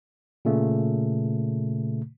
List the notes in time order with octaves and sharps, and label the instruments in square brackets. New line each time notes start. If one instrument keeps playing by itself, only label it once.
[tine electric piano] A#2 C#3 A3